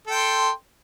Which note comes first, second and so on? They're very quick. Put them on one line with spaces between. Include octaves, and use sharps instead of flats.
A4 G5 C6